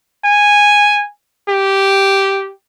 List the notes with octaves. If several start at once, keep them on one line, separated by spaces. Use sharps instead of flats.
G#5
G4